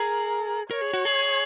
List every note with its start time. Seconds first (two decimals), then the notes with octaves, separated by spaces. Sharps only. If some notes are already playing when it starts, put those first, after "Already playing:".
Already playing: G#4 A#4
0.71 A#4 C#5
0.81 G#4
0.94 F#4
1.05 G#4